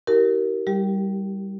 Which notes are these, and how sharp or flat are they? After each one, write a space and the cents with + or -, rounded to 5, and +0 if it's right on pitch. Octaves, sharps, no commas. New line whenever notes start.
E4 -40 G4 -35 A#4 +0
G3 +0 G4 +0